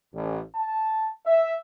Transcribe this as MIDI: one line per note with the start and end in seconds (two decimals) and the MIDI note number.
0.13 0.38 33
0.54 1.09 81
1.25 1.52 76